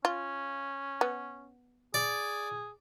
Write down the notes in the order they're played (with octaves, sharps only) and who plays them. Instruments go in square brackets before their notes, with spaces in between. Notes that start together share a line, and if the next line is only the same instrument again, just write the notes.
[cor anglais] C#4 [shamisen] F4
[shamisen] B3
[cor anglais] G#4 [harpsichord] D5